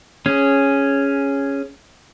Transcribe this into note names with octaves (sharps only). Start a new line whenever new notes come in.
C#4 G#4